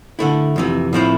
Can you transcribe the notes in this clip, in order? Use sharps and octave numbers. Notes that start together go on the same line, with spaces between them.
D3 A3 E4
F2 C3 E3
A2 F3 C4 E4